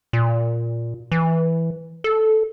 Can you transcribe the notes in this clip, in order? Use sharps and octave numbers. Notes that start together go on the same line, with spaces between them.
A#2
E3
A4